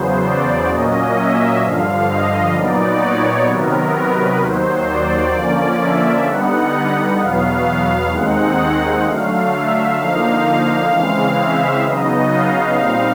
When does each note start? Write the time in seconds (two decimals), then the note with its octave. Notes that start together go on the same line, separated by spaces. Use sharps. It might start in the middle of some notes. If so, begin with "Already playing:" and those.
Already playing: E2 C#3 F#3 B3 C5
0.22 D5
0.69 A#2 F#3 A#3 C#4 D#5
1.15 E5
1.61 G2 D3 F3 F5
2.08 D#5
2.54 A#2 F#3 B3 D#4 D5
3.01 C#5
3.47 C3 D#3 F#3 B3 A#4
3.94 B4
4.40 D#2 D#3 F#3 C5
4.87 D5
5.33 D3 F3 A#3 C#4 D5
5.80 E5
6.26 D3 G3 B3 D#4 F#5
7.18 E2 B2 F#3 B3 F5
7.66 F5
8.11 D#2 D#3 G#3 C4 D#4 F#5
9.05 D3 F#3 A3 F5
9.51 E5
9.97 D3 F3 A#3 D#4 F5
10.44 F5
10.90 C#3 E3 G#3 C4 F5
11.37 E5
11.83 C#3 F#3 B3 D#4 D#5
12.30 F5
12.75 A#2 G3 C4 D#4 F5